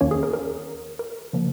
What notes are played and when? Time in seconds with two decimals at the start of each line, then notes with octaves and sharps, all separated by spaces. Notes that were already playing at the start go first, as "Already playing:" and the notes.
0.01 D#2 D#3 A#3 C#4 C#5
0.11 G#4
0.23 A#4
0.33 A#4
0.99 A#4
1.33 C#3 F3 A#3